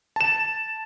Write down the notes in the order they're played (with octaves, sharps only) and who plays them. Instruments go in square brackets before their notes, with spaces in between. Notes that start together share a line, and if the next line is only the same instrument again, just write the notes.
[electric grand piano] A5 E7